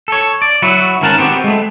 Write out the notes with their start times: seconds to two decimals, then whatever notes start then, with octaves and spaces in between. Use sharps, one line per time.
0.08 A4 C#5
0.42 D5
0.62 F#3 E4 F#4
1.01 G#2 D#3 C#4 A#4 F#5 A5
1.18 B3 C4 F#4 G4
1.44 G#3 A3